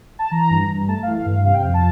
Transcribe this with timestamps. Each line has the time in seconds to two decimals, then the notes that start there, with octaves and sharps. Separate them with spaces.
0.19 A5
0.31 E3 A#5
0.50 G2
0.68 G2
0.88 A3 A5
1.03 F5
1.07 E3
1.16 F5
1.26 G2 F5
1.44 C3 F5
1.54 G5
1.63 F2 F5
1.74 A5